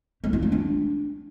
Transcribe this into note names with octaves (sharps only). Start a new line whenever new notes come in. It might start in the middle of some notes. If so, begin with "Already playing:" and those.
A3
F4
A3
D4